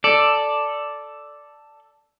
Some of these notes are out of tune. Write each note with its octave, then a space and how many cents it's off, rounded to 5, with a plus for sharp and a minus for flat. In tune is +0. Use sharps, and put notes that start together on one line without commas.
A4 +0 D5 +0